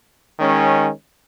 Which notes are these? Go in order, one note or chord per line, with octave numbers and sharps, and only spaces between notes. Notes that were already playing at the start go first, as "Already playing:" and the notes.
D#3 G#3 C#4